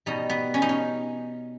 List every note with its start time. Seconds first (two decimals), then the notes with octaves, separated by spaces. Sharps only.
0.06 B2 G3 D#4
0.30 B3
0.54 C#4
0.62 D#4
0.69 C#4